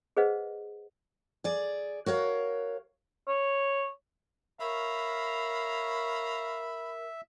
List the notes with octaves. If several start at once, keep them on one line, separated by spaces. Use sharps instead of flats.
G#4 B4 C5 D#5 F#5
G#4 D5
F#4 A#4 C#5 F5
C#5
A#4 C#5 E5 F5 A#5 B5